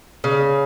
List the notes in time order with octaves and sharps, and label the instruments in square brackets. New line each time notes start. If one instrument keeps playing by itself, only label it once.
[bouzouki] C#3